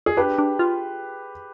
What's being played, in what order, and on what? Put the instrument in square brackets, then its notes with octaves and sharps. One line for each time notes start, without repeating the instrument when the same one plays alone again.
[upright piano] G#4
[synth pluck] D4 [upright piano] G4 B4
[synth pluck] D4
F4